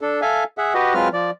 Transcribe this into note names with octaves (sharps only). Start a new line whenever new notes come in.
D4 A4
A4 E5 F5 G#5
G#4 E5 F#5
F#4 G4 B4 D#5
F#3 G#3 C4 F4 B4 F6
F3 D5